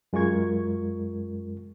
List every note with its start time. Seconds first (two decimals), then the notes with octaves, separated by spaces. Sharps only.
0.13 F#2 G#3 F4 A#4 C#6 G#6